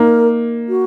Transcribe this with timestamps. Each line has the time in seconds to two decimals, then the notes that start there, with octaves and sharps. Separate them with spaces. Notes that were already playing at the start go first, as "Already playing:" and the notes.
Already playing: A#3 D#4 A#4
0.69 F#4